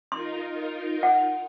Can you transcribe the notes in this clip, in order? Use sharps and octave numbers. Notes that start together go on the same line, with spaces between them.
D#4 F4 A#4 C6
F#5